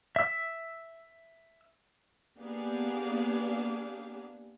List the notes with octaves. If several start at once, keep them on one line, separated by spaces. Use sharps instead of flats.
E5 E6
A#3 B3 D4 G4 G#4 F5